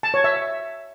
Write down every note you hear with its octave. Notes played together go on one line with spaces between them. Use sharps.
A5
C#5
E5